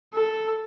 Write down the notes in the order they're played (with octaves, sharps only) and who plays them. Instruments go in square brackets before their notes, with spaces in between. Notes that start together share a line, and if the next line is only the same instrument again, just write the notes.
[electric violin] A4